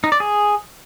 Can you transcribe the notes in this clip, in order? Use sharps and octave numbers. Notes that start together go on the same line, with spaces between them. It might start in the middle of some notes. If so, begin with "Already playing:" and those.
D#4
D5
G#4